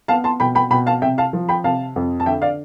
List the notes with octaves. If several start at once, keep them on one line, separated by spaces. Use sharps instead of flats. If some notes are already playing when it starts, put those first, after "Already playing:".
B3 F5 A5
A5 C6
B2 G5 B5
G5 B5
B2 G5 B5
F5 A5
C3 E5 G5
F5 A5
F3
G5 B5
C3 F5 A5
F2
A5
D3 E5 G5
D5 F5